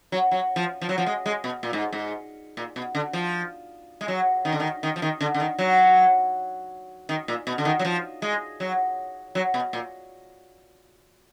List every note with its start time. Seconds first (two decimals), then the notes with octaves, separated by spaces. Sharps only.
0.12 F#3
0.31 F#3
0.56 F3
0.82 F3
0.89 F#3
0.98 F3
1.06 G#3
1.26 G#3
1.44 B2
1.63 A#2
1.73 G#2
1.93 G#2
2.57 A#2
2.76 B2
2.95 D3
3.13 F3
4.01 G#3
4.08 F#3
4.45 D#3
4.53 D3
4.60 D#3
4.83 D#3
4.96 F3
5.02 D#3
5.21 D3
5.34 D3
5.40 D#3
5.59 F#3
7.09 D#3
7.28 A#2
7.47 B2
7.58 D3
7.65 D#3
7.79 F#3
7.85 F3
8.22 G#3
8.60 F#3
9.35 F#3
9.54 B2
9.73 A#2